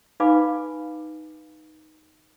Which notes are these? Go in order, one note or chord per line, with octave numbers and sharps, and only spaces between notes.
D#4 B4 F5 G#5 B5 D6